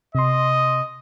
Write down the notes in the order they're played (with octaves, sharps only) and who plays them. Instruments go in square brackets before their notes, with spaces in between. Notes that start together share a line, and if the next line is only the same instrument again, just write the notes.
[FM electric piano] C3 C6 [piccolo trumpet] D#5